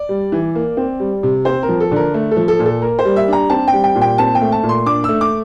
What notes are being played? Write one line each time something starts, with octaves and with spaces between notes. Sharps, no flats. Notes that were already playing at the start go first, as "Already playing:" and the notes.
Already playing: D5
G3
E3
A#3
C4
G3
C3
C4 C5
A#4
F3
A4
D3 A#4
A3
A4
F3
A4
A#2
A4
A#3 A#4
C5
G3
E5
D4 A#5
C4 A5
G5
G3
G5
A#2
G5
C4 A5
G5
A3
A5
A#2
C6
D4 D6
A3 E6
D6